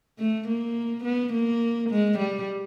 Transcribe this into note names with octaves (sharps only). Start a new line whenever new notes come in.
A3
A#3
B3
A#3
G#3
G3